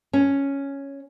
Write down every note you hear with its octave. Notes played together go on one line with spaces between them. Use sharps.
C#4